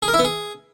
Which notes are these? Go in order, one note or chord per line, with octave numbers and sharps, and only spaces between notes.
G#4
A#4
E4
B3
G#4